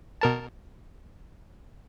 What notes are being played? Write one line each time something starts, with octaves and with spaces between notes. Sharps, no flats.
B2 A#4 A5